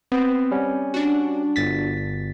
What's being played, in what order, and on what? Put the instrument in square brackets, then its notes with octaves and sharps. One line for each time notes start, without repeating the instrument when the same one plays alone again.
[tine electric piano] B3 [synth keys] C4
[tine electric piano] G3 C#4
[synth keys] D4 F#4
[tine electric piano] G1 A6 B6